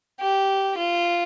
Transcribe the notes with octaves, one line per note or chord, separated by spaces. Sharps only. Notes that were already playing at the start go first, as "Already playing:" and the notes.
G4
F4